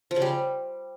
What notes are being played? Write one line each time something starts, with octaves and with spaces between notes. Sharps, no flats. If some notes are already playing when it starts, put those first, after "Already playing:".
F3
C#3
G3